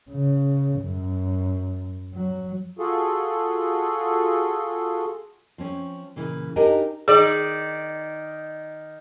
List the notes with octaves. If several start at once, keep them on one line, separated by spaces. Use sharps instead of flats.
C#3
F#2
F#3
F4 F#4 G#4 A4
F3 C4 C#4
A#2 C#3 E3
D4 D#4 G4 A#4 D#5 G#5
D#3 G#4 D5